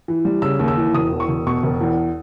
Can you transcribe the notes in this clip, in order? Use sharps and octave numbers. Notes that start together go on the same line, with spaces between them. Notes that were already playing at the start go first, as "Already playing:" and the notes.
E3
G3
C#3 E6
D#2
E6
E3
E1 D#6
E2
C#6
E1
B2 C#6
E1
E2